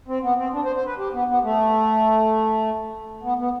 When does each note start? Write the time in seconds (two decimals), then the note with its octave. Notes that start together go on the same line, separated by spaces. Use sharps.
0.08 C4
0.23 B3
0.38 C4
0.53 D4
0.65 C5
0.76 C5
0.86 B4
0.98 G4
1.13 B3
1.28 B3
1.43 A3
3.23 B3
3.39 B3